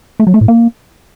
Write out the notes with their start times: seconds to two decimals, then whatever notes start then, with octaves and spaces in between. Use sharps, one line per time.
0.20 A3
0.27 F#3
0.34 A3
0.41 A2
0.48 A#3